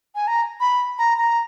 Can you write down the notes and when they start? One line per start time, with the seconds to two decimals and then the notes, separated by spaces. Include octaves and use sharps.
0.15 G#5
0.27 A#5
0.60 B5
0.98 A#5
1.18 A#5